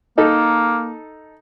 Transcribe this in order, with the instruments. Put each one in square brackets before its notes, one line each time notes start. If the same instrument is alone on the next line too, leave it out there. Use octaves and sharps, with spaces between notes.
[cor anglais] A#3 [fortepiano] D#4 A4